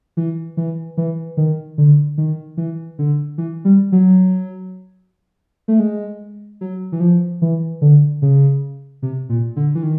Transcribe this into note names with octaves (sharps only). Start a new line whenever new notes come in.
E3
E3
E3
D#3
D3
D#3
E3
D3
E3
G3
F#3
A3
G#3
F#3
E3
F3
E3
D3
C#3
C3
A#2
D3
E3
D#3